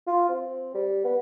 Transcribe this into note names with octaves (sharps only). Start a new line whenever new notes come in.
F4
C4
G3
B3